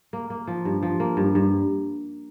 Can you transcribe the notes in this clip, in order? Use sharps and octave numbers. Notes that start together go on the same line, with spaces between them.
A#3
A#3
F3
G2
F3
A#3
G2
G2